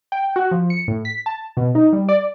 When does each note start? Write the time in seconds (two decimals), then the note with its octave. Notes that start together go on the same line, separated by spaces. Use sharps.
0.12 G5
0.36 F#4
0.51 F3
0.70 C#7
0.88 A2
1.05 B6
1.26 A5
1.57 B2
1.75 D#4
1.93 G3
2.09 D5